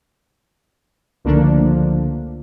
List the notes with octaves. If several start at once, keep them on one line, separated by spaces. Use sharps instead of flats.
C#2 D3 F3 A3 A#3 D4